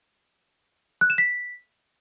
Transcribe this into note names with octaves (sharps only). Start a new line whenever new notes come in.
F#6
E7
B6